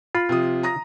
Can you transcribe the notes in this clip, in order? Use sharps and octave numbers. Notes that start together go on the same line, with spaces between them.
F4 B5
C3 F3 D#6
A#5 D#6 A#6